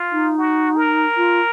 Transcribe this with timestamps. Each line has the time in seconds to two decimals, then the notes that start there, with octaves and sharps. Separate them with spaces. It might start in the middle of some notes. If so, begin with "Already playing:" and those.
Already playing: F4
0.12 D#4
0.38 F#4
0.77 A#4
1.17 F4